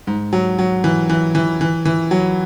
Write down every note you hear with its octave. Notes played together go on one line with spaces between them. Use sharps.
G#2
F#3
F#3
E3
E3
E3
E3
E3
F#3